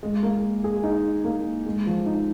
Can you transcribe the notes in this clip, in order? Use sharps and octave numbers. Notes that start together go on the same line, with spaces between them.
G#3
A#3
G#4
D#4
A#3
G#3
F3
D#4